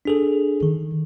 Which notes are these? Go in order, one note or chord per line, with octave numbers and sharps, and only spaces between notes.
D4 G#4 A4
D#3